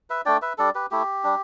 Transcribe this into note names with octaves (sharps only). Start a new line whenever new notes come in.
B4 E5
A3 D4 D5 G5
B4 E5
G3 D4 A4 D5
G4 B4
A3 E4 G4
G3 D4